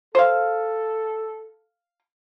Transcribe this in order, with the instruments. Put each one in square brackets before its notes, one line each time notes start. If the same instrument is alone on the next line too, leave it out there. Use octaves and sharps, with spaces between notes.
[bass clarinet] A4 [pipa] C5 F5